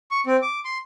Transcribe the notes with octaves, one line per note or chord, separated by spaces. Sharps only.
C#6
C4
D6
C6